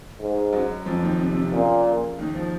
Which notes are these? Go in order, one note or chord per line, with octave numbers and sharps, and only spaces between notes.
G#2
F#2 F#3
F2 F3
D#2 D#3
C3
C3
A#2 C#3
D#2 D#3
F3